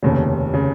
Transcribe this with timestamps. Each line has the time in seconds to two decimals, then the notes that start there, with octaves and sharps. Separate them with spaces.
0.03 F1 D#2 C#3
0.54 C#3